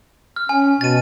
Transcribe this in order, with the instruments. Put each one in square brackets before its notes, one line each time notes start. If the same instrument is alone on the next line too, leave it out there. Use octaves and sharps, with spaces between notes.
[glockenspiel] F6
[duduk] C#4 [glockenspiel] G#5
[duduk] B2 [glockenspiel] A6 D#7